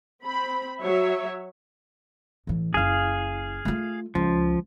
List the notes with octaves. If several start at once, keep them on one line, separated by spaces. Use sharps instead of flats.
C4 B5
F#3 C#5 E5
A2 E3
F#1 E4 G#4 F5
A3 F4
C#2 F3